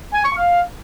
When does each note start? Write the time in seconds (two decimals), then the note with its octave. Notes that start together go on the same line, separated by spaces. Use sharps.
0.13 G#5
0.24 C#6
0.36 F5